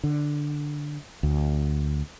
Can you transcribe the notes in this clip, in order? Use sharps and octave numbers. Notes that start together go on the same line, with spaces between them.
D3
D2